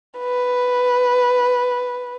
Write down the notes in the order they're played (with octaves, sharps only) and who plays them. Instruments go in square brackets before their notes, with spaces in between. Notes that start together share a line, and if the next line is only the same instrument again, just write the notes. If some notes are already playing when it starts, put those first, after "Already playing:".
[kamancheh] B4